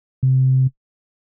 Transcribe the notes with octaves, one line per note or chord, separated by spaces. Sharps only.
C3